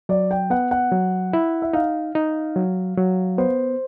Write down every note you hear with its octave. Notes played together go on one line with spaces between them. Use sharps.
F#3 D5
G5
B3 F#5
F#5
F#3
E4
E5
D#4 F5
D#4
F#3
F#3
B3 C5